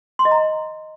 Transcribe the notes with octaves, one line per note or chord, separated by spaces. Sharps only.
C6
D#5
A#5